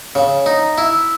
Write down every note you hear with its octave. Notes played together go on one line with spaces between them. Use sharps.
C#3
D#4
E4